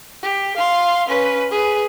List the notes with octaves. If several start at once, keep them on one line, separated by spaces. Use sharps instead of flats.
G4
F5 C6
C#4 B4
G#4 B4